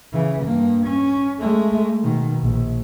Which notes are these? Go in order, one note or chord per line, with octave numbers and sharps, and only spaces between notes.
C#3 E3
G2 A#3
C#4
G#3 A3
B2 D#3
A#1